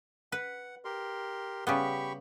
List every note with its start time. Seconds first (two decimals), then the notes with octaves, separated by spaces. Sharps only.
0.32 B4 F#5
0.85 G4 A#4 C6
1.67 C#3 G3 B3 G4 B5 C#6